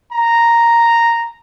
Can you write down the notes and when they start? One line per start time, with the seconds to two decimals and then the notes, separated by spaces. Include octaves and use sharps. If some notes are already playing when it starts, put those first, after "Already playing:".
0.13 A#5